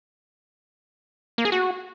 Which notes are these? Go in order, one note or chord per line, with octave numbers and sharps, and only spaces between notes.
A#3
G#4
F#4